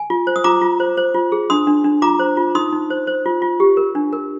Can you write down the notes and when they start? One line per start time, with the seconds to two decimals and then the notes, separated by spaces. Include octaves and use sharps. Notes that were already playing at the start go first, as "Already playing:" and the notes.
Already playing: G#5
0.10 F4
0.27 C5
0.36 D#6
0.44 F4 A#5 D6
0.62 F4
0.80 C5
0.97 C5
1.14 F4
1.32 G#4
1.50 D4 C6 D#6
1.67 D4
1.84 D4
2.02 F4 A#5 D6
2.19 C5
2.37 F4
2.55 D#4 C6 D#6
2.72 D#4
2.90 C5
3.07 C5
3.26 F4
3.42 F4
3.60 G4
3.77 A#4
3.95 D4
4.13 A#4